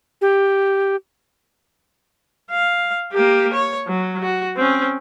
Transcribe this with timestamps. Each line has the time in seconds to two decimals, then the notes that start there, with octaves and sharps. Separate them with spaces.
0.21 G4
2.50 F5
3.12 A#3 G4
3.53 C#5
3.87 F#3
4.23 F#4
4.57 C4 C#4